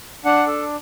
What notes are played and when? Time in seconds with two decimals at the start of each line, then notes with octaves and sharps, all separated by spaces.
0.25 D4 F#5
0.47 A4